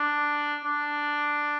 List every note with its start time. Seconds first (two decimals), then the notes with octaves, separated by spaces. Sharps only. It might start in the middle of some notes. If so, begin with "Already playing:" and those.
Already playing: D4
0.64 D4